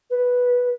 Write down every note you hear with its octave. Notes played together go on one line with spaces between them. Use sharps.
B4